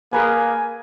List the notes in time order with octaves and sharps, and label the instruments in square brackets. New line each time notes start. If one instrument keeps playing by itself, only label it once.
[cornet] A#3 [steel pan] G#4 A#4 B4 [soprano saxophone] G#5